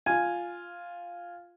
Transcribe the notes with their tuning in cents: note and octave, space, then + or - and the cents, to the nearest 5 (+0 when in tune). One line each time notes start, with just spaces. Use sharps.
F4 +0 G#5 +0